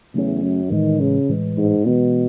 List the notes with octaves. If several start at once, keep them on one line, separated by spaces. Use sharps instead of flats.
E2 C#3 F#3 A3 C#4
F#2
A2 D#3 E3 G#3
C#3
A2 E3 G#3
G#2
B2 E3 G#3 B3